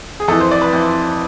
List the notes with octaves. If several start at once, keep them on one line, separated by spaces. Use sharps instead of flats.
G#4
F2 E3 A4
C5
D5
B4
F2 E3